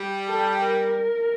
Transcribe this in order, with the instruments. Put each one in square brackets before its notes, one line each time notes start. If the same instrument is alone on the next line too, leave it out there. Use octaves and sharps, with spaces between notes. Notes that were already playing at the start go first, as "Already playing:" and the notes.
Already playing: [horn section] G3
[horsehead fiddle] A4
A#4